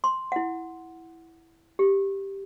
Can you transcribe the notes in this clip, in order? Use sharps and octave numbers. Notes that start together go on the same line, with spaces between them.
C6
E4 F#5
G4